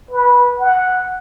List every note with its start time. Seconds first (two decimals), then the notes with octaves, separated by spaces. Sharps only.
0.11 B4
0.59 F#5